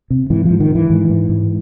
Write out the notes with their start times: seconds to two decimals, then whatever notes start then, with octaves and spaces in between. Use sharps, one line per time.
0.10 C3
0.30 G#2 E3
0.45 G#2 F3
0.60 D#3
0.70 G#2
0.75 E3
0.90 G#2
1.09 G#2
1.29 G#2